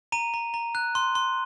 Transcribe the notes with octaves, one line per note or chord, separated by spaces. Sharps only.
A#5 D#7
A#5
A#5
F#6
C6
C6